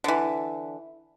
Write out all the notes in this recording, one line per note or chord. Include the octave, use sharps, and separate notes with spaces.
D3 E3